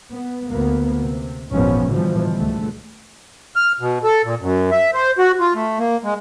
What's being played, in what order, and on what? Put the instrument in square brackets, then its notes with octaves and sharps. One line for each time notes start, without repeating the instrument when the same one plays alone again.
[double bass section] B3
D2 A#3 B3
C3
G#1 E2 A#2 F3 B3 C#4
G#2 B2 D3 E3 F3 G3
C#2 D3 A3
[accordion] F6
B2
A4
A#2
F#2
E5
C5
F#4
F4
A3
A#3
G#3